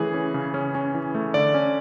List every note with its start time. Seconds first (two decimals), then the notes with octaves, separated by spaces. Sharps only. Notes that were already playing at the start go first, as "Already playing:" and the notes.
Already playing: C#3 E3 A3 C#4 G#4
0.14 C#4
0.34 C#3
0.54 C#4
0.75 C#4
0.94 E3
1.15 A3
1.34 D3 D5
1.54 C#4